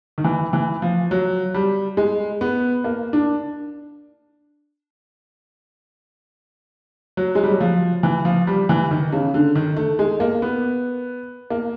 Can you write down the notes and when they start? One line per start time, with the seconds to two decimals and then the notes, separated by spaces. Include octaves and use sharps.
0.18 D#3
0.24 E3
0.53 E3
0.82 F3
1.11 F#3
1.54 G3
1.97 G#3
2.41 B3
2.84 A#3
3.13 D4
7.17 F#3
7.35 G#3
7.44 G3
7.52 F#3
7.60 F3
8.03 E3
8.25 F3
8.47 G3
8.69 E3
8.91 D#3
9.12 C#3
9.34 D3
9.55 D#3
9.77 A3
9.99 G#3
10.20 A#3
10.42 B3
11.50 A#3